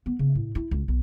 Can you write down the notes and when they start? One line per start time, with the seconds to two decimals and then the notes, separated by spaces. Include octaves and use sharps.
0.06 B3
0.19 C#3
0.35 A2
0.55 E4
0.71 C#2
0.88 B1